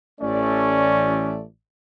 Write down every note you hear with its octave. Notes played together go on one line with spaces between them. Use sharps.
A1 A3 C#4 D5